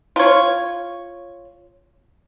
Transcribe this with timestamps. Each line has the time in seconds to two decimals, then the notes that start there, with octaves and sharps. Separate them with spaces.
0.16 F4 C#5